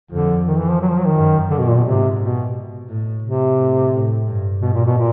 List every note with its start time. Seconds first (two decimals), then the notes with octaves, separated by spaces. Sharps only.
0.11 F2 D3
0.47 D#3
0.58 E3
0.70 F3
0.81 F#3
0.89 F3
0.98 F#3
1.07 D#3
1.16 F#2
1.51 D3
1.58 B2
1.68 A#2
1.76 B2
1.84 G#2 C3
2.20 B2
2.89 A2
3.23 C3
3.58 A2
3.93 A2
4.27 G2
4.62 G2 B2
4.74 A#2
4.86 B2
4.97 A#2